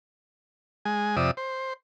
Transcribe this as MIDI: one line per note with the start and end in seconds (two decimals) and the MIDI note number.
0.85 1.16 56
0.85 1.16 80
1.16 1.31 41
1.16 1.31 48
1.16 1.31 74
1.16 1.31 76
1.16 1.31 87
1.37 1.73 72